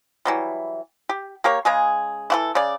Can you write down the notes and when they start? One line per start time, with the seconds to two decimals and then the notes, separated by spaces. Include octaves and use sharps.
0.25 E3 F#3 G3
1.09 G4
1.44 A#3 G4 A#4 C#5
1.65 C#3 G#3 G#4
2.30 E3 F#4 A4
2.55 C#3 D5